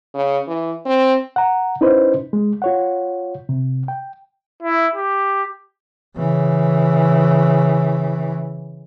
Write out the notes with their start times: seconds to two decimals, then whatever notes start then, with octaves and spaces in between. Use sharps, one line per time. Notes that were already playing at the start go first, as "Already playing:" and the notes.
0.14 C#3
0.47 E3
0.86 C4
1.36 F#5 A#5
1.81 C#4 D#4 E4 B4 C5 D#5
2.33 G#3
2.62 F4 C#5 F#5
3.49 C3
3.88 G5
4.63 E4
4.95 G4
6.17 C#3 E3